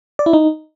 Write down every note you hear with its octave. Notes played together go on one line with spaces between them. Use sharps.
D5
E4
D#4